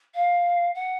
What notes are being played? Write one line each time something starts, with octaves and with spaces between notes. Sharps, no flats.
F5
F#5